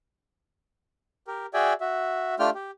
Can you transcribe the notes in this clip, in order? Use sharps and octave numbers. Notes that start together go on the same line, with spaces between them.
G4 A#4
F#4 G#4 D5 E5 G5 G#5
F#4 E5
A3 D4 F4 G4 G5 F6
G4